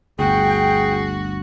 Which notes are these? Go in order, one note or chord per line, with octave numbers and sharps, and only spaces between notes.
G1 D2 F#4 G#4 G5